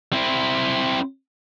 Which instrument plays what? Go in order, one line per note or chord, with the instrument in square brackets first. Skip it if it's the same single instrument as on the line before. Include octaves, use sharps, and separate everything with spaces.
[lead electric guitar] C4 E4